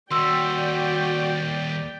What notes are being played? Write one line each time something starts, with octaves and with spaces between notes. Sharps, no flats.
D#2 G3 F#4 D5 G5 C6 E6